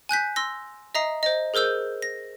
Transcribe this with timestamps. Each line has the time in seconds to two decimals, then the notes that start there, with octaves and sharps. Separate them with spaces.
0.09 G#5 F#6 G6 B6
0.36 C6 E6 A#6
0.95 D#5 E5 A#5 D#6 C7
1.23 C5 D#5
1.54 G#4 A#4 C5 E6 G6
2.02 A#6